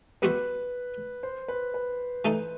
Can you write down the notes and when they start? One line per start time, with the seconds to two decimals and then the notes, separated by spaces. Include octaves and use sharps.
0.22 G3 B3 F#4 B4 C5 E5
1.23 C5
1.48 B4
1.74 B4
2.25 E3 A3 D#4 A4